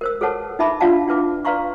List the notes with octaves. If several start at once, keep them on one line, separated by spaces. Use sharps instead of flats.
A#4 C5 E6
G#4 A4 B4 C#5 F#5 A5
D#4 E4 E5 A5 B5 D6
D4 F4 D5 F5 F#5 A5
D4 E4 B4 D6
B4 D5 F5 A#5 C6 C#6